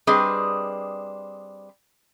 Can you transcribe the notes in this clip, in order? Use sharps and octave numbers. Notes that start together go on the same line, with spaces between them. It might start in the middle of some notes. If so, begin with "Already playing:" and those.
G3 C4 D4 G#4 B4 D#5